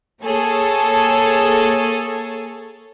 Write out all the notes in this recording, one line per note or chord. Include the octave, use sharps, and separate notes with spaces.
A#3 G#4 A4 C#5